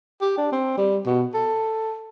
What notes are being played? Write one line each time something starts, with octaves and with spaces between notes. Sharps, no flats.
G4
D4
C4
G3
B2
A4